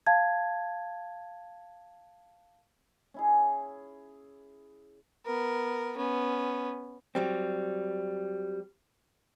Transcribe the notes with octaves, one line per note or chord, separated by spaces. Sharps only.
F5 A5 G#6
C#4 E4 G#4
B3 A#4
B3 C#4
F#3 G3 C4